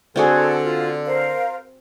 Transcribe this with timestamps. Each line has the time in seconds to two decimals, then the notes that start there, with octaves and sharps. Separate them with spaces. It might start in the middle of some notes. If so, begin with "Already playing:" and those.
0.16 D3 C4 F#4 G#4 A4
0.63 F4
1.06 A#4 C5 F5